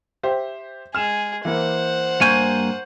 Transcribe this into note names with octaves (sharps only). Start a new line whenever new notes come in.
G4 C5 E5
G#3 G#4 F6 E7
E3 A#3 C5 F#5
G2 A#3 G#5 C#6 G6